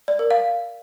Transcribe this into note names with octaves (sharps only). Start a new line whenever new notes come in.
D5
A#4
F5